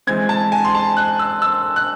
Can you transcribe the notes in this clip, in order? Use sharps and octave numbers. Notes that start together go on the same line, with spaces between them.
E3 G#3 C4 G#6
A5
G#5
C6
A5
F#6
E6
E6
F#6